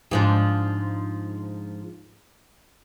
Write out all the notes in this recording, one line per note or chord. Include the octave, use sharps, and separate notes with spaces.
G#2 F3 D4